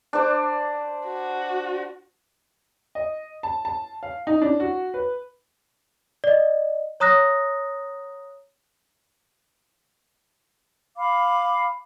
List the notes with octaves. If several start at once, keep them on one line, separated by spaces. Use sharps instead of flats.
D4 C5 D6
F#4
D#5
A5
A5
F5
D#4
D4
F#4
B4
D5 D#5
C#5 A#5 D#6 F#6 A#6
F5 B5 D6